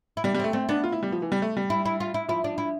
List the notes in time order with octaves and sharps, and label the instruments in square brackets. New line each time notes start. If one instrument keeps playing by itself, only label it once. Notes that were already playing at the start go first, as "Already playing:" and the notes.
[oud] E4
[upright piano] G3 [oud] D4
[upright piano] G3
[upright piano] A3 [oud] C4
[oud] A3 [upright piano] C4
[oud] B3 [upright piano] D4
[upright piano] F4
E4
G3
F3
E3
G3
A3
G3
[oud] E4
E4
F4
E4
[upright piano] F3 [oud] E4
[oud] D4
E4